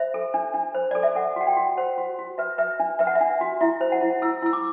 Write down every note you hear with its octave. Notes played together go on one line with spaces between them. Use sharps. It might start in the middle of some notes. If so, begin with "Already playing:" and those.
Already playing: C5 E5
A4
D4
D4
C5
A4 D5
E5
A4 F#5
F#4 F#5
G5
F#4
C5 F#5
F#4
F#4
B4 E5
B4 E5
D4
B4 E5
F#5
E5
D4
F#4
E4 E5
C5
F#5
E4
E4 E6
E4 E6
D6